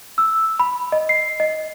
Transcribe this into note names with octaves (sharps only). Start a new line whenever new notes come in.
E6
B5
D#5
C7
D#5